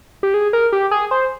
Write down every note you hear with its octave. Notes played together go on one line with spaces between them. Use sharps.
G4
G#4
A#4
G4
G#4
C5